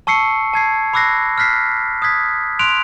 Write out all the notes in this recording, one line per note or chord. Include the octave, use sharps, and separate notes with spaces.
A5 C#6 E6 C7 C#7
A5 G#6 C7
B5 D6 E6 F#6 A#6 C7
F6 F#6 B6 C7
D#6 F#6 G#6 B6
C6 F#6 D7 F7